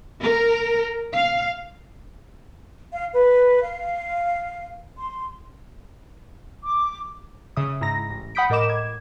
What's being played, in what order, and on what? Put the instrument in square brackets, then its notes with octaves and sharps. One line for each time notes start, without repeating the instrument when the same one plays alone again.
[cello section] A#4
F5
[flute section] F5
B4
F5
C6
D6
[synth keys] C#3 E5 D#6
G#2 E4 A#5 A#6
A1
F#5 B5 D#6 G6 B6 D7
A2 A#4 D#5 D6 E7
G#6